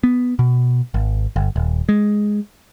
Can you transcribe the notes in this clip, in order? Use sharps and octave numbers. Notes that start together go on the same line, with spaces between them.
B3
B2
G#1
G1
D#1
G#3